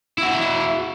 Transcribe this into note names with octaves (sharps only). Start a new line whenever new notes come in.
E4 F#4